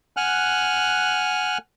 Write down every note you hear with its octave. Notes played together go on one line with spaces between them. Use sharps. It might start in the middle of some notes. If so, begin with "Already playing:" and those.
F#5 G#5 F6 F#6